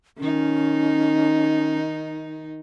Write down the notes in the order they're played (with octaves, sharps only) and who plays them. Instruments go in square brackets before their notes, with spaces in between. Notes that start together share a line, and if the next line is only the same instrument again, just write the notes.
[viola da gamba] D#3 D#4 [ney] C#4